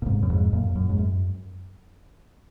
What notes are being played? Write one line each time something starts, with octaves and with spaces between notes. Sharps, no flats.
A#2
G#2 C3
F#2
F2 G#2
F#2 A#2
F#2
G#2
F#2